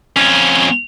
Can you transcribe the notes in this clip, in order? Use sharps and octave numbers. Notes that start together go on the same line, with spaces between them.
F2 C#4